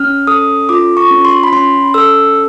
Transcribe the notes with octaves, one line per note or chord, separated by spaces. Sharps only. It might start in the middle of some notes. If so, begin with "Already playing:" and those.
Already playing: C#4 F6
A4 D#6
F4 D6
C#6
C#4
C6
B5
C#4 C6
A4 E6